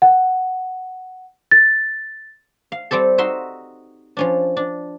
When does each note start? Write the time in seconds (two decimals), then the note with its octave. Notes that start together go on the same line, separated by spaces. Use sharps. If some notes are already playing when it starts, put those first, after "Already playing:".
0.02 F#5
1.51 A6
2.72 F5
2.91 G3 C4 G4 A4
3.18 D#4 F#4 E5 C6
4.17 F3 C#4 D4
4.57 D4